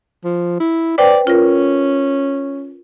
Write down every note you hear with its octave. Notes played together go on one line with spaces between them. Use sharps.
F3
E4
B4 C5 D5 G5
C#4 F4 A#4